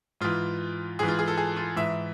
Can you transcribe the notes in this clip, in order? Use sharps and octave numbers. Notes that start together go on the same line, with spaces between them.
G#2 E3 F4
G#2 E3 G#4
F4
G#4
A4
G#4
F4
G#2 E3 E5